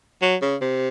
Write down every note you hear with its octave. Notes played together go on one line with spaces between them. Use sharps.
F#3
C#3
C3